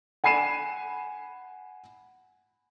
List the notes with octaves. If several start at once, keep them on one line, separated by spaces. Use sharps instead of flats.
F#5 G#5 B5 C7 D#7 E7